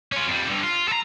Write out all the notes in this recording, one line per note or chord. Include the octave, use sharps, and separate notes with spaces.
C#4 F4
F2 G3
G2 D3
F4
A4 A#5